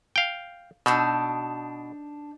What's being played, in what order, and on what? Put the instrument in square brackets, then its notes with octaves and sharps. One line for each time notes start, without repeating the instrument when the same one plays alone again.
[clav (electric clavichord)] F5 G5
[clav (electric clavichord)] B2 [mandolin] D4 D#4 E6